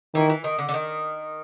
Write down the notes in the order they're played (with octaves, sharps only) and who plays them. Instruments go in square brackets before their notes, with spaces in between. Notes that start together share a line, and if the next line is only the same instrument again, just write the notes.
[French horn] D#3 [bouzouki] E3
[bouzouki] E3
D#3
D3
D3
D#3